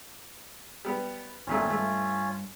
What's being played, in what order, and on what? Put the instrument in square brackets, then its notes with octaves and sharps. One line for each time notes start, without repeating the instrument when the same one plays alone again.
[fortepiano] G3 B3
[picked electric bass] G1 D#3 C4 [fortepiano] C2 A#2 A3 [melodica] C#4 F4
[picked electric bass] G2 [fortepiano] A3